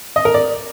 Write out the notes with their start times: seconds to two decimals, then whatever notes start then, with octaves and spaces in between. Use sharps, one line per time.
0.16 D#5
0.25 A#4
0.34 D5